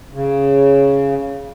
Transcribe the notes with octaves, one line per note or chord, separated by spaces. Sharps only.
C#3